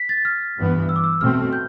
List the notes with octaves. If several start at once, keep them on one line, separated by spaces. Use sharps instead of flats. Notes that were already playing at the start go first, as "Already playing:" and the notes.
Already playing: B6
A6
F6
G2 E3 B3
E6
D6
E6
B2 A3 C4 F6
G6